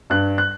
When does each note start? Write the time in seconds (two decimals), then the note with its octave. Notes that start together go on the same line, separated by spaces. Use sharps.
0.10 G2 F#6
0.38 F#6